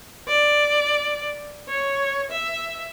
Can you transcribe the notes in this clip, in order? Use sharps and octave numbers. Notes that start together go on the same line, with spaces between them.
D5
C#5
E5